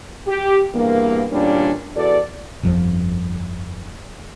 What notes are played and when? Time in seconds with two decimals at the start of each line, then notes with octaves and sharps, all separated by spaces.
0.27 G4
0.74 E2 G2 A#3
1.31 E2 A#2 G3 C#4 D4
1.95 E2 F#4 A4 D5
2.63 G1 F2 F3